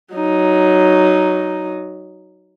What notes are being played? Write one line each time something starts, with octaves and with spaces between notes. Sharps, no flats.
F#3 D#4